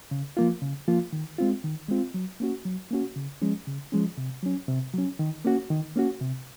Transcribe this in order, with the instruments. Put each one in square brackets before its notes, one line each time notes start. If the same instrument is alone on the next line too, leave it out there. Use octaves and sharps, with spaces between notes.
[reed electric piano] C#3
F3 A#3 F4
C#3
F3 A#3 F4
D#3
G#3 C4 F4
D#3
G#3 C4 F4
F#3
A#3 C#4 F#4
F#3
A#3 C#4 F#4
C#3
F3 G#3 C#4
C#3
F3 G#3 C#4
C3
F#3 C#4
C3
F#3 C#4
D#3
A#3 C#4 F#4
D#3
A#3 C#4 F#4
C3